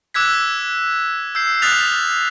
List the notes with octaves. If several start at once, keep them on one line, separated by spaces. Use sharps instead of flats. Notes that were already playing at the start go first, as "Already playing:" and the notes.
D6 E6 F#6 G#6 B6
E6 G6 C7
D#6 F6 F#6 A6 B6 F7